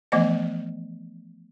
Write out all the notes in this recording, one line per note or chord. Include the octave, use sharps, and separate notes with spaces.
E3 F3 A3 B3 C5 D#5